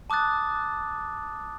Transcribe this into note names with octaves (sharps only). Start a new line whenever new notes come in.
A5 D6 D#6 F#6 A6